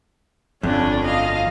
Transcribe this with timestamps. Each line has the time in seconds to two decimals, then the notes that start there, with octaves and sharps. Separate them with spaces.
0.63 G1 F2 F3 C#4 D4
1.04 D#5 F5